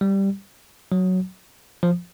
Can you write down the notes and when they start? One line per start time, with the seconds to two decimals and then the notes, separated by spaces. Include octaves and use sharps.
0.01 G3
0.92 F#3
1.83 F3